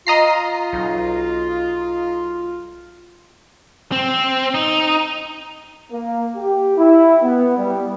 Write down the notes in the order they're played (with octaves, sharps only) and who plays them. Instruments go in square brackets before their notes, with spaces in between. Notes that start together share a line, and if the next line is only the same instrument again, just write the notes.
[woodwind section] F4 [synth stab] D#5 A#5 C7
[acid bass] B1
[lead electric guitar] C4
D#4
[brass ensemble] A#3
G4
E4
B3
G3